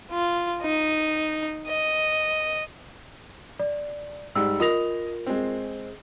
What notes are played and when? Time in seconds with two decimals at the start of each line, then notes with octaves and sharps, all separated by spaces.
0.11 F4
0.62 D#4
1.67 D#5
3.60 D5
4.35 G#2 G3 E6
4.60 F4 A#4 D#5 D#6 A#6 F7
5.27 G#3 C4